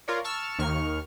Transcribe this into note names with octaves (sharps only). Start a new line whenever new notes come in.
F4 A#4 C#5 D5
A5 C#6 E6 F6 E7
D#2 D#3 C#6 F6